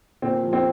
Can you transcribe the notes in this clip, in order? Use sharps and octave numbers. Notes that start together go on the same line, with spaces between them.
A#2 C4
F3
C4